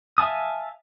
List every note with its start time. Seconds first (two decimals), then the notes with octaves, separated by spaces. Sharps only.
0.18 E5 F5 G#5 A5 D#6